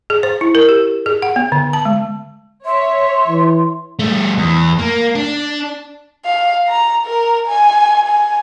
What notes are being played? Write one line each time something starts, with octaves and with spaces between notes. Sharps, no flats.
G#4
C5
E4
A#4
G4
G#4
F#5
B3
D3
A5
G#3
C#5 E5 C6
E3
G3 A3
E2
A#3
D4
F5
A#5
A#4
G#5
G#5